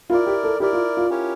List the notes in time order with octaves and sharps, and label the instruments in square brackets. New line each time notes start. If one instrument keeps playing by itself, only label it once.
[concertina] E4 A#4 D5 [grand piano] F4
[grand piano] G4
A4
[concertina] E4 A#4 D5 [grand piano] G4
[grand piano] F4
F4
[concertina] C#4 E4 G4 A#4 C#5